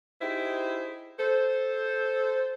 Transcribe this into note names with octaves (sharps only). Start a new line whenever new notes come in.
D#4 E4 G4 G#4 C5
A4 C5